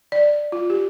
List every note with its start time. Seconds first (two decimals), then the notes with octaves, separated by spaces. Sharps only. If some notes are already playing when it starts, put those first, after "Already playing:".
0.12 D5
0.52 F4
0.70 G4